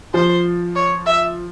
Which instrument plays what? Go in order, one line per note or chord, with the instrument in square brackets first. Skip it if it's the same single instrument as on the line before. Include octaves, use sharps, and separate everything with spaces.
[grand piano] F3 [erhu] C5
[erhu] C#5
E5